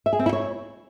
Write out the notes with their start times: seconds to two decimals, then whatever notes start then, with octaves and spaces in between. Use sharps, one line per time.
0.06 E5
0.13 G#4
0.19 C4
0.26 E4
0.33 C#5